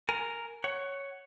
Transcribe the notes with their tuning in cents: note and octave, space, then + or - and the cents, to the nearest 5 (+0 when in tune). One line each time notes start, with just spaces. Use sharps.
A#4 -5 G#5 +10
C#5 +0 F#5 +20